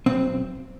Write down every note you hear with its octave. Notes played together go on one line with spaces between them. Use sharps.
B1 C4